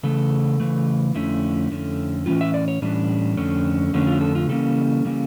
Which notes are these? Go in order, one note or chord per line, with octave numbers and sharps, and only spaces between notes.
C#3 E3 A3 A4
C#3 E3 A3
F2 D3 A3 C#4 E4
F2 D3 A3 C#4
A2 E3 G3 C#4 F4
E5
D5
C#5
A2 E3 G3 C#4 D4
F2 D3 A3 C#4
F2 D3 A3 C#4
F4
A4
F4
C#3 E3 G3 A#3 C#4 A4
C#3 E3 G3 A#3 C#4